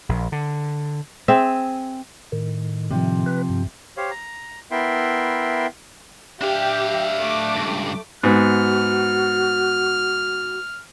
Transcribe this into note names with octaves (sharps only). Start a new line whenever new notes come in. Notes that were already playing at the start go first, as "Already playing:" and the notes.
A#1
D3
C4 G#4 E5
A2 D#3
C3 F3
B4
G2
G4 C5 C#5 F5
A#5
B3 E4 A#4 E5 G5 C6
D4 G4 E5 F5
A3 D6
C#2 G2
G#2 B3 F#4 F6